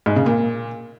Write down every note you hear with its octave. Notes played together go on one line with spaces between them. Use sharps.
G#2
C#3
A#2